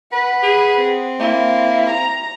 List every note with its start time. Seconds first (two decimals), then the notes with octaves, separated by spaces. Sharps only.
0.13 B4 F#5
0.43 G#4
0.78 C4
1.20 A#3 E4
1.90 A#5